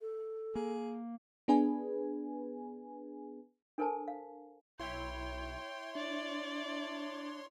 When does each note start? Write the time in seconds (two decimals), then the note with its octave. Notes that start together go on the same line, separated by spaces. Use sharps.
0.01 A4
0.55 A#3 G#4
1.48 B3 D4 G#4 B4 G#5
3.78 D4 A4 A#4 C5 G#5 A5
4.08 F5
4.80 B1 E4 C#5 G5 C6
5.95 D4 D5